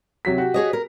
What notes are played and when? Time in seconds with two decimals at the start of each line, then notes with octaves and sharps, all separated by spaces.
0.25 C3 F#3 B6
0.38 F#4 G4
0.54 G#4 C#5 D#5
0.73 A#4